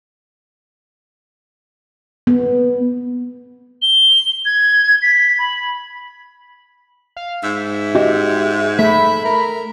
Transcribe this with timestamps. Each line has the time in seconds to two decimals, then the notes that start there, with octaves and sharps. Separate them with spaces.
2.27 B3
3.82 G7
4.45 G#6
5.02 B6
5.39 B5
7.16 F5
7.43 G#2 E5
7.95 F#4 G4 D#5
8.79 A3 E5 B5
9.25 A#4